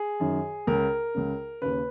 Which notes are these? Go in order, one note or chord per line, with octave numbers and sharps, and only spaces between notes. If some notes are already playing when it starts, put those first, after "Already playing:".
Already playing: G#4
F#2 D#3
C#2 C#3 A#4
C#2 C#3
D#2 C#3 B4